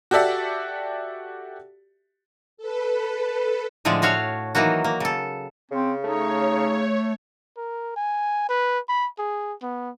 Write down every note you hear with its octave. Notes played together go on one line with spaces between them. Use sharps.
F#4 G4 A4 D5 E5 F#5
A4 B4
A2 D3 F3 G#3 D5
A3 F#4 C#5 F5
D#3 E3 F#3 A#3 F#4
A#3
C#3 A4
C#3 C4
A3 D#4 C#5
A#4
G#5
B4
B5
G#4
B3